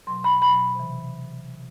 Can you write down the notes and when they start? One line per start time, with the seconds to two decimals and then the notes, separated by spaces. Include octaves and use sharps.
0.07 B2 F#3 C6
0.24 B5
0.42 B2 F#3 B5
0.75 C3 E3